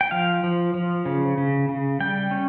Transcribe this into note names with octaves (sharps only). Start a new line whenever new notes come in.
G5
F3 F5
F3
F3
C#3
C#3
C#3
G3 G5
C#4